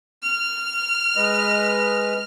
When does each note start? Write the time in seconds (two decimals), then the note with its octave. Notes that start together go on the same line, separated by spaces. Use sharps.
0.23 F6
1.16 G#3 B4 D#5